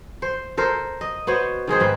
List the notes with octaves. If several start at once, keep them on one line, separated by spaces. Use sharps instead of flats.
C5
A4 A#4 C5
D#5
B3 F#4 C5 C#5
D#3 G#3 G#4 C5
G#2 C4 B4